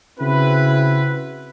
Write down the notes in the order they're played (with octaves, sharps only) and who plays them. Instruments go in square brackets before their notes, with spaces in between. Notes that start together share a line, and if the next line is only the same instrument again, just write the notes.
[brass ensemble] C#3 C4 E4 F#4 B4